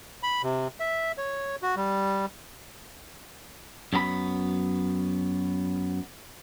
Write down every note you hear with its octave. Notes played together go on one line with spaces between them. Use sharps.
B5
C3
E5
C#5
F#4
G3
F#2 F#3 B3 A#5 B5